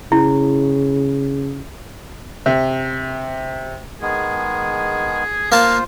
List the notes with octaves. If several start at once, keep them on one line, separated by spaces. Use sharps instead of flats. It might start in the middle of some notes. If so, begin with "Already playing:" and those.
C#3 E4
C3
D#3 G#3 B3 G#4
A#3 F4 C5 F5 A5